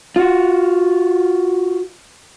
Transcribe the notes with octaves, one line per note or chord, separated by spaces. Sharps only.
F4 F#4